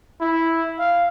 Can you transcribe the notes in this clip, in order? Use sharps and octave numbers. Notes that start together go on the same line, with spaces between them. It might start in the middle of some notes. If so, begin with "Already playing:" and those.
E4
F5